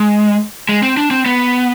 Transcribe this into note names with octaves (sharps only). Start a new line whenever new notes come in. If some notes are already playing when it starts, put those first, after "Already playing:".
Already playing: G#3
G#3
C4
D4
C4
B3